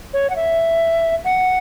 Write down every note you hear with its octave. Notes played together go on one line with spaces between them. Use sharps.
C#5
F#5
E5
F#5